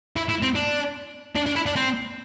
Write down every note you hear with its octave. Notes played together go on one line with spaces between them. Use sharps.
E4
E4
C4
D4
D4
D4
E4
D4
C4